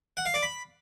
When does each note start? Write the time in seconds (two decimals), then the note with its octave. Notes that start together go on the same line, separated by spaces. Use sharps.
0.17 F#5
0.26 F5
0.34 D5
0.43 B5